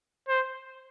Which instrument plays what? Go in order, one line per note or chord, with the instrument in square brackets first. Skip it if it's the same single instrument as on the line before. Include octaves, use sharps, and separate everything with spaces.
[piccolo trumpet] C5